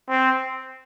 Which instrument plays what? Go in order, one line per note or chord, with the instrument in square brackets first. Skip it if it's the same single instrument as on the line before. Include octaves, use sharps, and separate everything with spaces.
[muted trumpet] C4